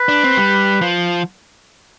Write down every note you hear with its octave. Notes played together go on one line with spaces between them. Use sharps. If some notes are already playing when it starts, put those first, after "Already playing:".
Already playing: B4
D4
C4
G3
F3